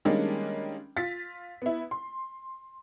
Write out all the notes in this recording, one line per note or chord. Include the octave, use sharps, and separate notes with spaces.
D#3 G3 G#3 A#3 C#4 D4
F4 A6 B6
B3 E4
C6